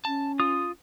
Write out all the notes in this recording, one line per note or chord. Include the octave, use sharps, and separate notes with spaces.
C#4 A5
F4 D#6